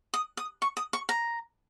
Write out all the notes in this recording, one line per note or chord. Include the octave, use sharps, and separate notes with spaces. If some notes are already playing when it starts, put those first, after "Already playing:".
D#6
D#6
C#6
D#6
C#6
A#5